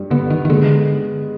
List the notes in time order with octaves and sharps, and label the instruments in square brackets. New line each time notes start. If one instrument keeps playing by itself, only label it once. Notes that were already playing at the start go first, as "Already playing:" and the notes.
Already playing: [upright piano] G2
[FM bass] D3 [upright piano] B3
[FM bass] D#3
D#3
[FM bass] D3 [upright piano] G#3